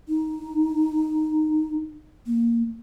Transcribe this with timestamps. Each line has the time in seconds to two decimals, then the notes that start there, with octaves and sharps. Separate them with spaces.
0.09 D#4
2.26 A#3